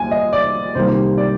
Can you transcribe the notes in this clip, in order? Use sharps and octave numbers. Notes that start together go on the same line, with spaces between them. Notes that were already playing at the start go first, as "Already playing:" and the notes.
Already playing: D#2 G#5
D#5
D5
C2 C3 D#3 G3 A#3 C5
D5